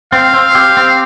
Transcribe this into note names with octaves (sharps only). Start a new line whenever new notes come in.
C4 F5
C4
G4
C4